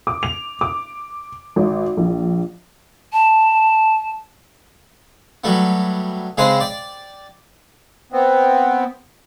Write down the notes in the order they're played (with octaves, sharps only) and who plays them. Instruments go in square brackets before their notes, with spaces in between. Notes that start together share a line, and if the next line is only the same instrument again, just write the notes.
[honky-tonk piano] D6
F7
D6
G#1
A#1
[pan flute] A5
[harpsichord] F#3 G3 A3 B3
C#3 G#3 C4 D#4 B4 C5
D5 G5
[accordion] B3 C4